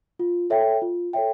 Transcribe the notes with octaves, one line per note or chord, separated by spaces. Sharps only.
F4
A4 C#5 E5 G5
F4
A4 C#5 E5 G5